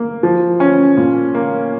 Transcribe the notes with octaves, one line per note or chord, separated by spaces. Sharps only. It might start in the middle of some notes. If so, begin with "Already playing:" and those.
Already playing: A#3
F3
C#4
A#2
A#3